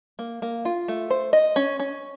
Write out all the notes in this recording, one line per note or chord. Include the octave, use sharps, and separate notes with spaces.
A#3
A#3
F4
A3
C5
D#5
C#4
C#4